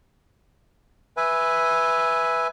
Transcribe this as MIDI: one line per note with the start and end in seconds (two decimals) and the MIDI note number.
1.17 2.48 71
1.17 2.48 76
1.17 2.48 80